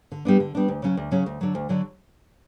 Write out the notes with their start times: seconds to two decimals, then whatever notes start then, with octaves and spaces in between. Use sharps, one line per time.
0.12 D3
0.25 G3 B3 D4
0.40 D3
0.55 G3 B3 D4
0.68 D2
0.82 C#3 F#3 C#4
0.97 D2
1.11 C#3 F#3 C#4
1.26 D2
1.41 D3 F#3
1.55 D2
1.69 D3 F#3